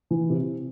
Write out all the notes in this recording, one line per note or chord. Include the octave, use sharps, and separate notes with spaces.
E3
C3